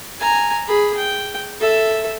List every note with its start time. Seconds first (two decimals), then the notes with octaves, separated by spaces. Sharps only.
0.20 G#5 A#5
0.68 G#4 B5
0.97 G5
1.60 A4 E5